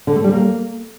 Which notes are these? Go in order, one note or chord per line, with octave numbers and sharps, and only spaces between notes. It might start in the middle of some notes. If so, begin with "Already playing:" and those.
D3
A3
G3
A#3